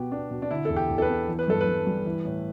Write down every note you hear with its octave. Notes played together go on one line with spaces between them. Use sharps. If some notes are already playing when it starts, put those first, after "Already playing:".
Already playing: B2 B3 G4
B3 D4
B2
D4
D3 E4
E2 A4
G4
E2
A4
B4
B3
E3
B4
G2 A4
B4
G2
G3
E3
A2